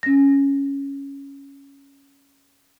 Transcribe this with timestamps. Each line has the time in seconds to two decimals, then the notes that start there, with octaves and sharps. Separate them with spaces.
0.03 C#4 A#6